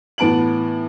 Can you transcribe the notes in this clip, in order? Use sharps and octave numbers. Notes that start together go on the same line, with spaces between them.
A2 E3 B3 A5 D7 F#7